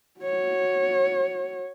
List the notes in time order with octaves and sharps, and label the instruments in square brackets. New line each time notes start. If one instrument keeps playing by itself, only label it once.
[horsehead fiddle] F#4 C#5